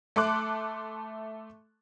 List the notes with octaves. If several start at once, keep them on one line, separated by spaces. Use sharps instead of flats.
A3 A4 C6 D6 F#6